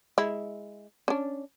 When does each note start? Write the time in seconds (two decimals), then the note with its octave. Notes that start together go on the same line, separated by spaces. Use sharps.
0.18 G#3 E4
1.08 C#4 D4